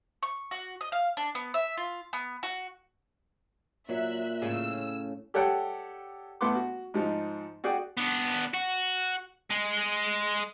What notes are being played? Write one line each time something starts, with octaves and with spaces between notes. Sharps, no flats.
C#6
F#4
D#5
F5
D4
B3
E5
F4
B3
F#4
A#2 F#3 E5 F#6
A2 C#3 E6
G4 A4 C#5 D5 F#5 G5
A2 B3 F#5 C6 D6
F#4
G#2 F3 D#4
F#4 G#4 D5 F#5 G5
B3 D4
F#4
G#3 G#4